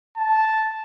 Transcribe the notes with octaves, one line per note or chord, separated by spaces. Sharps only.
A5